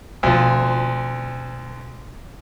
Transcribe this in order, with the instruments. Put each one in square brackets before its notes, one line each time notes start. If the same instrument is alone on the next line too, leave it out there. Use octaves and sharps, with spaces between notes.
[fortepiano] D2 F3 [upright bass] B2 C4